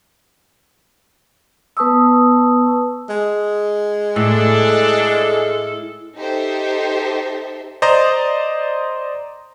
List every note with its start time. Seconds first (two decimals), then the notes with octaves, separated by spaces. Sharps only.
1.77 B3 B4 A5 C#6 D#6 E6
3.09 G#3
4.16 A2 D4 A4
6.16 D#4 G4 A4 C5 E5
7.82 C5 D5 D#5 A#5